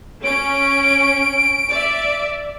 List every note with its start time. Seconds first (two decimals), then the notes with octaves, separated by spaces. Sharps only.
0.24 C#4 D7
1.70 D5 E5